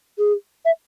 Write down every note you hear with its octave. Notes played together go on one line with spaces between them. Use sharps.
G#4
E5